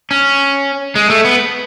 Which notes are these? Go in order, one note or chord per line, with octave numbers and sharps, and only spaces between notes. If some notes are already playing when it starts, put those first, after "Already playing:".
C#4
G#3
A3
B3